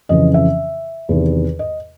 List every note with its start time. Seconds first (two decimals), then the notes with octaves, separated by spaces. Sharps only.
0.09 F2 C#3 E3 D#5
0.34 E5
1.09 E2 C3 D#3
1.59 D#5